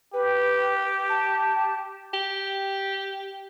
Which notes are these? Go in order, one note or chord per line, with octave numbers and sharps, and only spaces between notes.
G4 B4
A5
G4